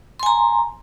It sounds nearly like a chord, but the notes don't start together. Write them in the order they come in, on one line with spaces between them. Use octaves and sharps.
C6 G#5 A#5